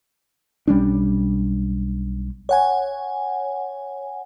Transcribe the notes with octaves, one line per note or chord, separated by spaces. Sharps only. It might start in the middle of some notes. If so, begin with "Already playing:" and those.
B1 G3 C#4 D4
C#5 F#5 G#5